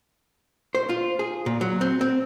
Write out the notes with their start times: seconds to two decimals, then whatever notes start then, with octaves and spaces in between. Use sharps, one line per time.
0.75 C5
0.89 F4
1.19 G#4
1.46 A#2
1.61 F#3
1.81 C4
2.01 C4